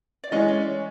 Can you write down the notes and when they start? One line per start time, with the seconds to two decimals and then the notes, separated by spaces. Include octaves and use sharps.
0.24 D5
0.31 E3 G#3 C#4 D#5
0.48 D5